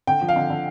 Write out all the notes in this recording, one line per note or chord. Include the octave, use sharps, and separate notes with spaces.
D3 G5
F3
F5
D3
D3